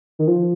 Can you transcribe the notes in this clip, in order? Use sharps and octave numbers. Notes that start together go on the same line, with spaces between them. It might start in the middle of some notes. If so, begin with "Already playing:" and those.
D#3
F3